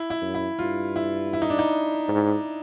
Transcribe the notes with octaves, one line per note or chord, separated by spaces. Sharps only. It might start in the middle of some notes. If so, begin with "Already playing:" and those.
Already playing: E4
E4
F#2
E4
G2 F4
E4
E4
D#4
D4
D#4
G#2